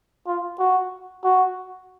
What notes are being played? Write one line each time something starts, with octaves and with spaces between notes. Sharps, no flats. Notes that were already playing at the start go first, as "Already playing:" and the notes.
F4
F#4
F#4